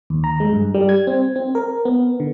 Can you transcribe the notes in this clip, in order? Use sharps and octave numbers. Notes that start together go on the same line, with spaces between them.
D#2
A#5
G#3
G2
G3
G#6
C4
C4
A#4
B3
D3